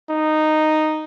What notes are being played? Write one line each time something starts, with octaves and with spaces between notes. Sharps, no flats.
D#4